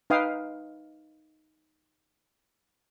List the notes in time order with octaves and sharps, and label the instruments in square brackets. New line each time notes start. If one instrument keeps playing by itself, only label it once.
[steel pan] D#4 B4 F5 G5 D#6